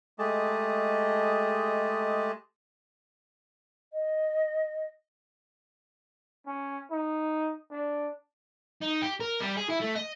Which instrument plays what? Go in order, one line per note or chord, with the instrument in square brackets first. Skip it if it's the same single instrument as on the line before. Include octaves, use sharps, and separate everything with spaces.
[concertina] G#3 A3 G4 G#4 D#5 A5
[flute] D#5
[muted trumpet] C#4
D#4
D4
[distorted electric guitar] D#4
G4
A#4
G3
G#4
E4
A3
D#5